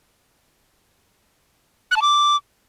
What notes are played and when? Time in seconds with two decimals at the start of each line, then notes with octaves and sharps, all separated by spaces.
1.91 F#6
1.96 A5
2.02 D6